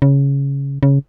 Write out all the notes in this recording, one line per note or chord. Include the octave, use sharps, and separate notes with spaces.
C#3
C#3